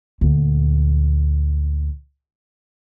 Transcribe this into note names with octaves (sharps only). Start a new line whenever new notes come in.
D2 A#2